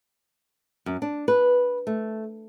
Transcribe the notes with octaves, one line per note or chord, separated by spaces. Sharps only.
F#2
D4
B4
A3